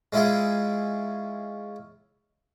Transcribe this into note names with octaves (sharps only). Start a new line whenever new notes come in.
G#3 C#4 E4 F4 G#4